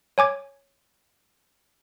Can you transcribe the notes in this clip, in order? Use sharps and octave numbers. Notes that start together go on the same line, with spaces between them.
C#5 G#5 D6 G#6